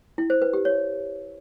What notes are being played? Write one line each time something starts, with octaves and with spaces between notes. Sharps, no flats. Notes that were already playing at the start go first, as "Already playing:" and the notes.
E4
C5
B4
G4
C#5